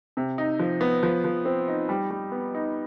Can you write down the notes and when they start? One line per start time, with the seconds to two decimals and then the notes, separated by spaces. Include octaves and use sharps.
0.17 C3
0.38 D#4
0.59 F3
0.81 B3
1.03 F3
1.24 F3
1.45 C4
1.68 D#4
1.89 G3
2.11 G3
2.32 B3
2.55 D#4